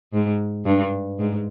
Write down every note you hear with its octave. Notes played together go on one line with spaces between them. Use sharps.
G#2
G2
G#2